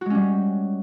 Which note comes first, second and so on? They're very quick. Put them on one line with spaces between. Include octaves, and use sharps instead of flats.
F#4 G#3 C#4 G3